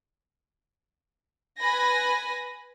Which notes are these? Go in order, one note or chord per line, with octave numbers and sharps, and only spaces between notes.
B4 G#5 B5 A#6